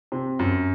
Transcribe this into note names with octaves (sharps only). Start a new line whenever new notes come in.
C3
F#2